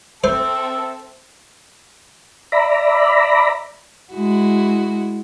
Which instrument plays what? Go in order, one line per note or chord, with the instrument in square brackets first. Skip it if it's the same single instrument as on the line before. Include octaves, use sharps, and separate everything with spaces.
[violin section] C4 A4 [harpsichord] C5 [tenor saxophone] E5
[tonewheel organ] D5 E5 A#5 B5
[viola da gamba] G#3 E4 F#4